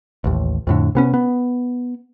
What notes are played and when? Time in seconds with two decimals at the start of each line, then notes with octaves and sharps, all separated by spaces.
0.24 A1 D#2
0.67 F2 A2 D3
0.95 C3 B3 C#4
1.14 B3